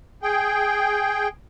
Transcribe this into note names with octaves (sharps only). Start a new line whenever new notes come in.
G#4 G5